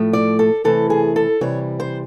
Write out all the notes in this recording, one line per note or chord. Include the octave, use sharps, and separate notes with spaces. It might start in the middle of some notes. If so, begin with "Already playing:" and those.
Already playing: A2 F3 A3
D5
A4
C3 E3 A3 A4
G#4
A4
C3 E3 G3 C#5
C5